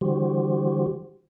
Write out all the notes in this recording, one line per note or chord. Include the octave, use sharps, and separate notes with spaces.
D3 E3 G3 F#4 G4 C5